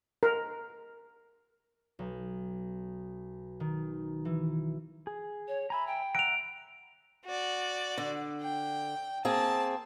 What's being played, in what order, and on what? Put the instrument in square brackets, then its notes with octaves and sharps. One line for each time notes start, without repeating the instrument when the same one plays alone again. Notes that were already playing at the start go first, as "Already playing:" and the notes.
[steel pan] A#4
[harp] B1
D#3
E3
[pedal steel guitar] G#4
[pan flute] C#5
[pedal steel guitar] E5 G#5 A#5 [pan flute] B5
[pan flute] G5
[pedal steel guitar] E5 F#5 A#5 [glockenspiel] D7 F7
[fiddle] F#4 D5
[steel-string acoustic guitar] D3
[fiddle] G5
[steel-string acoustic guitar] A#3 C4 G#4 [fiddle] A5